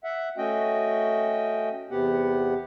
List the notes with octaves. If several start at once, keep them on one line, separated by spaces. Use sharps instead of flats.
E5 F#5
A3 C#4 F#4 D#5 G5
E2 C3 B3 G4 F#5